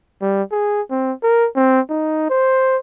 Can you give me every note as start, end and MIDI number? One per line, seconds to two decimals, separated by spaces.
0.22 0.43 55
0.52 0.82 68
0.91 1.13 60
1.23 1.48 70
1.56 1.80 60
1.90 2.29 63
2.30 2.77 72